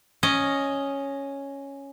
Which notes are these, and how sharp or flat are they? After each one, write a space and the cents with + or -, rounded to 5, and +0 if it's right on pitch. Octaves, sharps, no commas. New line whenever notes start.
C#4 +0 D#5 +0